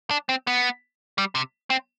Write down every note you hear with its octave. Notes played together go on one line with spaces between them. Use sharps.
D4
C4
B3
G3
C3
C4